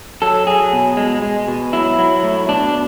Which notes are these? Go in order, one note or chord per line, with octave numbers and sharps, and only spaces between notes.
F#3 A4
F#3 G#4
B2
G#3
G#3
B2
F#3 E4
F#3
A2
B2 D4